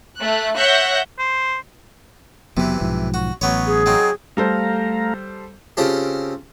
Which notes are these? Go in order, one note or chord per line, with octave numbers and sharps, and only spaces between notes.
A3 F#6
C#5 E5 F#5 F#6 G6 A#6
C5
F#1 C3 E3 F#3 B3
B1 G#2 F3
F#4
A1 F#3 B3 C#5
G#4
F#3 C4 D#4
G3 A3 A4 C5 F5 A#5
C#3 C4 F4 G4 A4